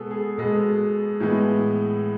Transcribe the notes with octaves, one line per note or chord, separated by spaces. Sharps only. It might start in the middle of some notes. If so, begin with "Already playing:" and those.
Already playing: B2 G#3 B3 G#4 A4
G#4
B2 G#3 B3 A4
A2 E3 G#3 B3